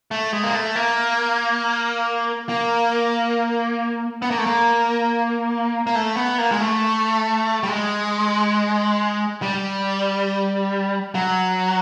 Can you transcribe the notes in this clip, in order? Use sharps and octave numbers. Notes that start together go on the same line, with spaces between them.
A3
G#3
A#3
A3
A#3
A#3
B3
A#3
A3
A#3
A#3
A3
B3
A#3
G#3
A3
G3
G#3
G3
F#3